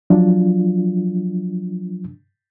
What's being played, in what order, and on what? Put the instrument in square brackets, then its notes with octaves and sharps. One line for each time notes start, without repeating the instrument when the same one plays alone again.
[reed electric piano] F3 F#3 D4 F4